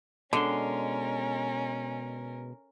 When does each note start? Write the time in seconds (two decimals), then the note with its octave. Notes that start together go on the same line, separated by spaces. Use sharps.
0.33 B2 D3 G#3 C#4 A#4 C6